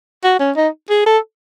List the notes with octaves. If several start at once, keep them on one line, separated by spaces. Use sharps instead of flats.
F#4
C#4
D#4
G#4
A4